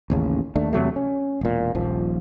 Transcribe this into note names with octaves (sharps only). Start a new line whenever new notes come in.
A1 D#2 C#3
D#2 A3 D4
E2 C3 F#3 A3
C#4
E1 A#2
D#1 A#1 F3